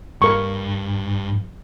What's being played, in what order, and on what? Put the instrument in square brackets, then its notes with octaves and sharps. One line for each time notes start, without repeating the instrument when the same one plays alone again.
[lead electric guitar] G2 [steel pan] A#4 C#6